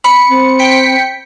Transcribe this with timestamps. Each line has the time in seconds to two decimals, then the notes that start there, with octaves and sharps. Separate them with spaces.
0.04 B5 C#7
0.28 C4
0.59 G5 B6 C#7